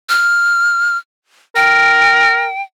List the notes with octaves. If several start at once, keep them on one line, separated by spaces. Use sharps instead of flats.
F6
A#4 G5